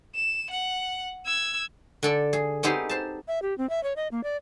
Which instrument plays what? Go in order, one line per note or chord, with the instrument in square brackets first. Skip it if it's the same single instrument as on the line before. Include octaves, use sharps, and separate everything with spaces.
[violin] E7
F#5
E6 G#6
[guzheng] D3 A4 D5
G#4
B3 C4 D#4 G4 G#4 C5
C5 A5
[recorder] E5
G4
C4
E5
C#5
D#5
A#3
D5